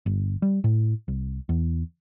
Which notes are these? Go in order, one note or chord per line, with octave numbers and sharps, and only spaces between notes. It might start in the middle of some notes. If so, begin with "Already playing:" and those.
G1
G3
A2
C2
E2